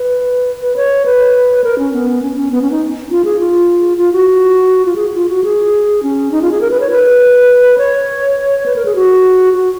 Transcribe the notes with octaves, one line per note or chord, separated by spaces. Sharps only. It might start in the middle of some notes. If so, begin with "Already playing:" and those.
Already playing: B4
B4
C#5
B4
A#4
C#4
B3
C#4
C#4
B3
C#4
D#4
F4
G#4
F4
F4
F#4
F4
G#4
F4
F#4
G#4
C#4
D#4
F4
G#4
A#4
B4
C#5
B4
C#5
B4
A#4
G#4
F#4
F#4